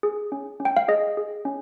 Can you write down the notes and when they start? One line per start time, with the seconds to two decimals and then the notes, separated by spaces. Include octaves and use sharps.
0.03 G#4
0.32 C#4
0.60 C#4
0.65 G5
0.77 F5
0.88 G#4 D#5
1.17 G#4
1.45 C#4